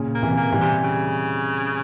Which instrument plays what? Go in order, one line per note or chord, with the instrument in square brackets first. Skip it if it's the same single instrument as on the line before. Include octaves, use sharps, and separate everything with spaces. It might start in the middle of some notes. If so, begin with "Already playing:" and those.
Already playing: [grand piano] A#2 C#3
[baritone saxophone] A#3
[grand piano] C3 E3
[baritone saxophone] A#3
[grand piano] E3 G3
[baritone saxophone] C3
C#3